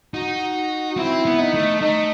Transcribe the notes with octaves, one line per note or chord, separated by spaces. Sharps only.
D#4 F#4
C4 E4
B3
D#4
A3
A3 D#4